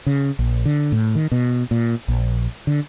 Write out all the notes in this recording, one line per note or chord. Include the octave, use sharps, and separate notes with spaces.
C#3
A#1
D3
A2
D#3
B2
A#2
A#1
D3